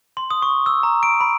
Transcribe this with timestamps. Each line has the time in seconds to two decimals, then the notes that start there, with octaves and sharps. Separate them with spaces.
0.17 C6
0.31 D#6
0.42 C#6
0.66 E6
0.83 A#5
1.03 D7
1.21 B5